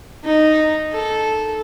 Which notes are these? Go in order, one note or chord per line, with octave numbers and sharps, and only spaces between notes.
D#4
A4